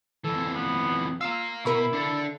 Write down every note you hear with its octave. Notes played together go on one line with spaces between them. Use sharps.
F2 E3 A4
B3
F4 F5 A#5 E6
B2 E4 A#4 B4 B5 C#6
D4 A4